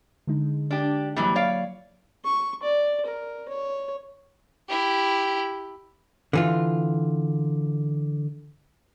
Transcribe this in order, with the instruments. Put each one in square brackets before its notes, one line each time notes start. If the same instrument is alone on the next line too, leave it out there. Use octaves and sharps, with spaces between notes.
[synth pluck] D3 G#3 D#4
[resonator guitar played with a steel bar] D4 G4
[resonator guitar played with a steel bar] G#2 E3 G3 [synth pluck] F#3 A#3
[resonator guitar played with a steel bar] C#5 D5 F5
[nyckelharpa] C#6
D5
A#4
C#5
[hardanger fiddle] E4 G4
[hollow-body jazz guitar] D3 E3 F4